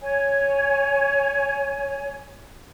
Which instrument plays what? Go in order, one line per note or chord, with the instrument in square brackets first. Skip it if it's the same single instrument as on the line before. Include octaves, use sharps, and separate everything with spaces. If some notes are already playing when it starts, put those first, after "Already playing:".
[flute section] C#5 G#5